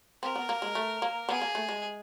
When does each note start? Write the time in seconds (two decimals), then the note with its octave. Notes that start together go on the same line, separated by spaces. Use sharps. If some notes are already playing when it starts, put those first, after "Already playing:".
0.22 C4 A#4
0.36 B3
0.49 A#3
0.62 G#3
0.75 A3
1.02 A#3
1.28 B3 G#4
1.42 A#3
1.55 A3
1.69 G#3